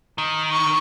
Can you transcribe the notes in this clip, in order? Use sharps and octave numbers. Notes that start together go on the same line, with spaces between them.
D#3
C#6